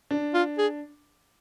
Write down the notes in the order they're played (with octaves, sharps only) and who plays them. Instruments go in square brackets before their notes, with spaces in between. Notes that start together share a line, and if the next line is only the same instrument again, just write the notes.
[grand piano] D4
[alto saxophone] F4
G#4